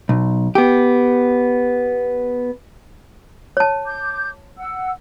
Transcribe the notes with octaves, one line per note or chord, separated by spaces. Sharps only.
B1
B3 G4
C#5 A5
D6 G6
F#5 E6